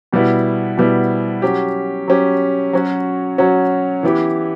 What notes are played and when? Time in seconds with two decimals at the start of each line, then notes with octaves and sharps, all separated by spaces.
0.13 B2 G3 B3 E4
0.77 B2 G3 B3 E4
1.42 F#3 C#4 G4
2.08 F#3 C#4 G4
2.73 F#3 C#4 F#4
3.38 F#3 C#4 F#4
4.03 E3 B3 E4 G4